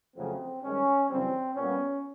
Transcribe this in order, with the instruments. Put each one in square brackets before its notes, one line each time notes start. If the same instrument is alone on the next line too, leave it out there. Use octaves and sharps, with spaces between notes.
[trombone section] F2 C#3 F#3 A3 C4
G2 D#3 G#3 C#4
F#2 C#3 E3 G3 C4
A#2 G3 B3 C#4